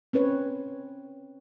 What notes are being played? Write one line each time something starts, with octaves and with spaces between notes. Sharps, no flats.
C4 C#4 B4 C#5